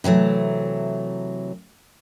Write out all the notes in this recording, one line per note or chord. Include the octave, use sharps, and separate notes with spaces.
C3 E3 F#3 A3